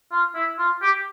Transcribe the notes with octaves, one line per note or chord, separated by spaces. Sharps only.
F4
E4
F4
G4